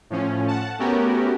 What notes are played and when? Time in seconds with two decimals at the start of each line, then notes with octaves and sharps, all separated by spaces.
0.10 A2 F3 C#4
0.48 F#5 A5
0.79 A3 B3 C#4 F#4 G4 A#4